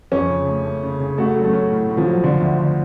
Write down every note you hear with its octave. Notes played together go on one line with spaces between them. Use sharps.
F2 C#4
C#3
A3
A3
C#3
C#3
A3 F#4
F#3
A3
C#4
A2
A2
F3
F#3
D3 F3
D2
D3